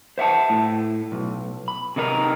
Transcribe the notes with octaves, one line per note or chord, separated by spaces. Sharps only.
C5 E5 F#5 A5
A2
B1
B5
C3 D#3 D#4 E4 A#4